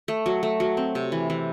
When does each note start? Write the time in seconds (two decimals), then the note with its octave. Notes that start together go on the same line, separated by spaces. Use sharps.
0.08 A3
0.26 F#3
0.43 A3
0.60 F#3
0.77 C4
0.95 C3
1.12 E3
1.30 E3